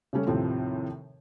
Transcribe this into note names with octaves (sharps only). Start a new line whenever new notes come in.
C#3 G3 A3 C#4
D#2 A2 C3 F3 C4